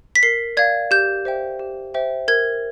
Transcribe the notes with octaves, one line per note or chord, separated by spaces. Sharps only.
B6
A#4 C7
D5 F5 G#6
G4 G6
C5 E5 G5
G4
C5 E5 G5
A#4 G#6